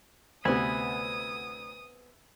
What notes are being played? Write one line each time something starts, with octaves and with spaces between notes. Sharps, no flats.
D2 C3 B3 C4 E5 G#5 B5 D#6